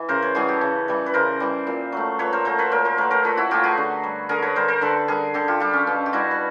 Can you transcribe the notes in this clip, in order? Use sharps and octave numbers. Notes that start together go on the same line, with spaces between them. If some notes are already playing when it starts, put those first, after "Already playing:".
Already playing: E3
C#3 A#4 C5
B4 C#5
E3 G3 F#4 G#4
G4 A4
C#3
E3 G3
B4
C#3 A#4 C5
E3 G3
A#2
F#3 A3
A#2 B4 C#5
A#4 C5
F#3 A3 A#4 C5
B4 C#5
A#2 A#4 C5
A#4 C5
F#3 A3 B4 C#5
A#4 C5
A#2 A4 B4
E4 F#4
F#3 A3 F4 G4
F#4 G#4
D3
G3
D3 G#4 A#4
B4 C#5
G3 A#4 C5
A#4 C5
D3 A4 B4
G3 G#4 A#4
D3 G4 A4
F4 G4
G3 F4 G4
C#4
B2 C#4
G4
G3 E4 F#4
B4